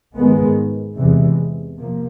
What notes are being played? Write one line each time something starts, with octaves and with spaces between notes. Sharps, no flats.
G#2 D#3 G#3 B3
E2 C3 E3 G#3
C3 F3 A#3